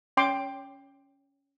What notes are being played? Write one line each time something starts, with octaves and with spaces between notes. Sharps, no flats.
C#4 G5 C6 D6